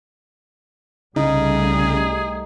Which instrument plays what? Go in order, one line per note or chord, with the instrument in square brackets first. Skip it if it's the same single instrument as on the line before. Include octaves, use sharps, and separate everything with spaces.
[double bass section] C2 G3 A3 [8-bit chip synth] C#3 [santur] D#4 [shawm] G#4